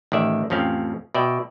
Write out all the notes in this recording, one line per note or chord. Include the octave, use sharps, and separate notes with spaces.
A1 D#3 D5 E5
A1 F2 C4 C#4 F5
B2 D5 E5 G5